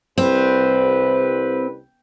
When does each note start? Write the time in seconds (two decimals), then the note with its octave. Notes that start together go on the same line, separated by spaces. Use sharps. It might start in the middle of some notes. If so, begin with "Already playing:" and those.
0.18 C2 C4 B4